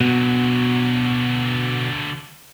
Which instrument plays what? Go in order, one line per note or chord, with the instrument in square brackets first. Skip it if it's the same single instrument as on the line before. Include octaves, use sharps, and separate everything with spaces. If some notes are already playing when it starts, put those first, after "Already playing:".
[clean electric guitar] B2 [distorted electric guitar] D3 F#3